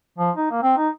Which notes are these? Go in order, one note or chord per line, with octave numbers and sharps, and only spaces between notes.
F3
D#4
A#3
C4
D#4